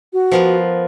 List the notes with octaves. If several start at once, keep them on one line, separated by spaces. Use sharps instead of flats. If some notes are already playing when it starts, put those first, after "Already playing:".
F#4
F3 B3 A#4